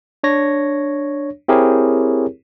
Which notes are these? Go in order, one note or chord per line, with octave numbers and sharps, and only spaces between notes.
D4 C#5 A#6
C4 E4 G4 G#4 A#4 C#5